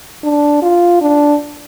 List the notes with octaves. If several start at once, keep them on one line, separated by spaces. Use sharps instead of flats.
D4
F4
D4